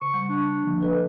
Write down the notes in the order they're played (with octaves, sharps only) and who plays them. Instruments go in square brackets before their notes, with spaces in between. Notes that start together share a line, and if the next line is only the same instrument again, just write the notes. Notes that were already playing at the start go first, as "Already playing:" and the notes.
[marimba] C#3 [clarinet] C#6
[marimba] G3
[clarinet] D4
[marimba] D3 F3 A#3
[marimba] F#3 A4 D#5 [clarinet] B4